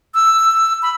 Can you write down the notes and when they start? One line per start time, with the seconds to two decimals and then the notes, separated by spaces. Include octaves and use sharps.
0.15 E6
0.82 B5